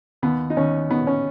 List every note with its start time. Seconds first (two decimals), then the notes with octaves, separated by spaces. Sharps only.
0.22 D#2 B3
0.50 D#4
0.56 D#2 C#4
0.90 D#3 B3
1.07 C#4